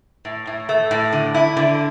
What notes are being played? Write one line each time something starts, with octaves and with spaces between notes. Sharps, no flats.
A2
A2
A3
A2
D3
E4
D3